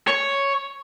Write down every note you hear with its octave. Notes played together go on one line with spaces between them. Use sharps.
C#5